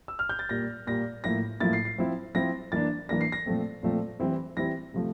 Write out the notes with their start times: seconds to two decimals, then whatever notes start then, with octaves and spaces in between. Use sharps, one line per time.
0.08 E6
0.19 F6
0.29 G6
0.39 A6
0.49 A#2 G3 A#3 A#6
0.87 A#2 G3 A#3 A#6
1.24 A2 F3 A#3 E4 A#6
1.60 A2 F3 A#3 E4 A6
1.73 C7
1.85 C7
1.98 F3 C4 E4
2.35 F3 C4 E4 A#6
2.72 E3 A#3 D4 A6
3.09 E3 A#3 D4 A#6
3.21 C7
3.32 A#6
3.46 A#2 F3 A3 C4
3.83 A#2 F3 A3 C4
4.20 E3 G3 C4 E4
4.57 E3 G3 C4 E4 A#6
4.94 C3 F3 A3